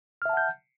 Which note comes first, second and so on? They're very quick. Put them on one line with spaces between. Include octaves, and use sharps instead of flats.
F6 E5 A5 F#5 G6